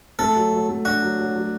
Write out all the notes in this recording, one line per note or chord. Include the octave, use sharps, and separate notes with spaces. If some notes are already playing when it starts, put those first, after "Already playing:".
A3 A4
F#3
F#3
A3
D4 F#4
F#3
F#3
F#3